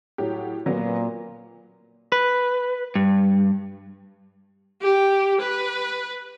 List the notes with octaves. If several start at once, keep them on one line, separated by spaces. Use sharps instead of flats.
A2 F#3 G4
A#2 F#3 B3
B4
G2
G4
B4